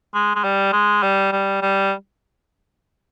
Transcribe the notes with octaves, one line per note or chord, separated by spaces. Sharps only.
G#3
G#3
G3
G#3
G3
G3
G3